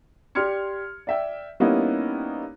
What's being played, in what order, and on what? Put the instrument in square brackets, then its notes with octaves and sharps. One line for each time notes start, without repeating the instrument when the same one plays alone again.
[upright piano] G4 D5 C6 F6 G#6 C#7
D5 E5 G5
G3 A#3 B3 C#4 D#4 E4